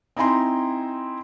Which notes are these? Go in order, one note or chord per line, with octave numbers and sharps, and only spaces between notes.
C4 D#4 E4 G#5 A#5 C6